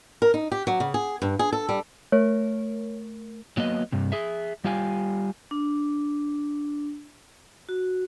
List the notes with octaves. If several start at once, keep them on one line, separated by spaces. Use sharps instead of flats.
A#4
D#4
G4
F#3
C#3
G#4
G2
G#4
A4
G3
A3 A#4 C#5
F#3 A#3 B3 D#5
G2 C3
G#4 E5
G3 F4 G4 F5 G#5
D4
F#4